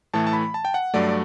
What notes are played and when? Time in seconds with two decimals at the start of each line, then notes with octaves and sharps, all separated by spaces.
0.14 A2 E3 A3 A5
0.27 A5
0.33 B5
0.54 A5
0.65 G5
0.74 F#5
0.94 G2 F#3 A3 D5
1.09 D5